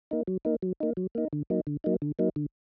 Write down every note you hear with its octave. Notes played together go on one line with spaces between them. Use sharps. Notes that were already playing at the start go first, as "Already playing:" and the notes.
A#3 D#4
F#3
A#3 D#4
F#3
A#3 D#4
F#3
A#3 D#4
D3
F#3 A#3 D#4
D3
F#3 A#3 D#4
D3
F#3 A#3 D#4
D3